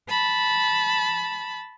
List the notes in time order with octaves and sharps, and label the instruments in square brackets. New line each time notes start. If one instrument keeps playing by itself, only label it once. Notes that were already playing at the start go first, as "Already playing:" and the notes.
[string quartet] A5 B5